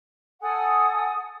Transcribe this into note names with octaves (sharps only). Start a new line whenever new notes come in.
A4 F#5 G#5 D#6